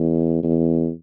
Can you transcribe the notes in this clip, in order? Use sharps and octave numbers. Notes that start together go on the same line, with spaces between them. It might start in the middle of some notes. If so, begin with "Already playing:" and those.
Already playing: E2
E2